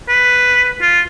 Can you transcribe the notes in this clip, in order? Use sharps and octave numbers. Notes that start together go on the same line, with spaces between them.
B4
F4